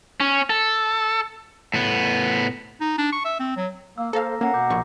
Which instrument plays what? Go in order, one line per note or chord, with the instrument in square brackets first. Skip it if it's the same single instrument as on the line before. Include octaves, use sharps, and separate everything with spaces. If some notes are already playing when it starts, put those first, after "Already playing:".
[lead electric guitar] C#4
A4
[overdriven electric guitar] A2 B3
[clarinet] D#4
D4
C#6
E5
C4
F#3
[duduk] A#3 [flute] F5 [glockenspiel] E6
[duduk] A#3 [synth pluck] A4 F5 [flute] C5 [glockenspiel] A#5 A#6
[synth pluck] A#3 [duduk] C#4 [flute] F#5 [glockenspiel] A#5 A#6 C7
[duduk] B2 [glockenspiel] D6 G6
[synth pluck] A#1 C#6